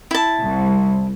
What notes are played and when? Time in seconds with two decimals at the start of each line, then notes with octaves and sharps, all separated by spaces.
0.11 E4 A5
0.42 C2